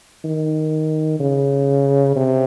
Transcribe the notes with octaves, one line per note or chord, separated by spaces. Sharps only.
D#3
C#3
C3